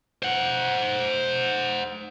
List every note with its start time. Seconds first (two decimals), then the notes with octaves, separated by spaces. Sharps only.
0.23 C5 F#5